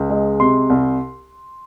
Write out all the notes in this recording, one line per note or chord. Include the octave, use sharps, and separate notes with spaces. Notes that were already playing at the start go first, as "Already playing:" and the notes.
Already playing: C#2
G#3
C3 C6
C2